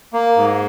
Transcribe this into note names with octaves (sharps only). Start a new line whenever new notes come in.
A#3
G#2